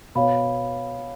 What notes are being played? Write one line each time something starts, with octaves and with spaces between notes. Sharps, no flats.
B2 C#5 F5 B5